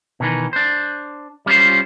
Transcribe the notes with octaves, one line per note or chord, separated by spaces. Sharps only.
B2 D#3 E3
D4 C5
G3 C#4 E4 F4 C5